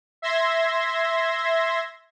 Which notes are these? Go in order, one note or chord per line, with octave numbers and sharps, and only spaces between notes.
E5 C6 G#6 A#6